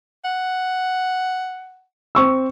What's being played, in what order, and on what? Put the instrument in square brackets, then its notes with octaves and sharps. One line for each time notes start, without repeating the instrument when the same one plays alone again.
[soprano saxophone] F#5
[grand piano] C4 C#6 E6